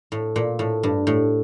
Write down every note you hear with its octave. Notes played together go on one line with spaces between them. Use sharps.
A2
A#2
A2
G2
A2